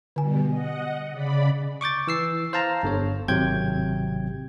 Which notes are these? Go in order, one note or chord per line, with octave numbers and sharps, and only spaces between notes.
B2 D3 G3 G#5
D#5 F#5
C#3 D5 B5
C#6 D6 G6 A6
E3 E6 C7
C5 F5 A5 A#5
G1 D3 C#5
G#1 C3 F#3 G5 G6 G#6